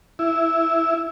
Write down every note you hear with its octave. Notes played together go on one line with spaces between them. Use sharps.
E4